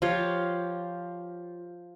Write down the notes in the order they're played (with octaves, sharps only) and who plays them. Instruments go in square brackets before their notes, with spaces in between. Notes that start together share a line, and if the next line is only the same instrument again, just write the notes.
[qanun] F3 F4 G4 C#5